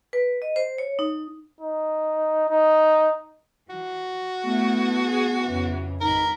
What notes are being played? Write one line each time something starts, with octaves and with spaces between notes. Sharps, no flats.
B4
D#5
C5
C#5
D#4
D#4
D#4
E3 F#4
A3 B3 E4
G#4
F2 C#3 E3
G#1 D#4 A#4 B5